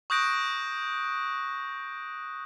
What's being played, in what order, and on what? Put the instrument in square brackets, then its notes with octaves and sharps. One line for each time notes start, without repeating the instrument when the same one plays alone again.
[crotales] C#6 D#6 F#6 G6 A#6 D7